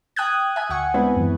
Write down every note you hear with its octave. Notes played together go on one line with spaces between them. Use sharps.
G5 D#6 F#6 G#6
E5 G#5
D2 F#5 C#6
G#3 B3 C4 D4 E4 B4
F#2 E3